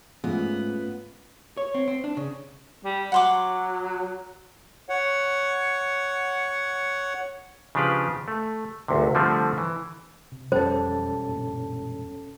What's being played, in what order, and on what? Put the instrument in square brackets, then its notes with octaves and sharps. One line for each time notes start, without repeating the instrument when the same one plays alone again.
[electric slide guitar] G#2 [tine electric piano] A3 C#4 F4 [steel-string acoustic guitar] B3
[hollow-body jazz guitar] C#5
C4
C4
D4
C#3
[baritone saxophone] G3
[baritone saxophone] F#3 [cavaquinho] F#5 C6 D6
[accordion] C#5 F#5
[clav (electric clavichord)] C#3 F3 D4 G4 B4
A3
G#1 D2 C3
D3 F3 G3 A3 C4
E3
[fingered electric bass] C3
[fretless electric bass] E1 B2 G3 [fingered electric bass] F2 [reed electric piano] C#4 A4 A5 [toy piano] C5
[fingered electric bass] F#2 A#2 D4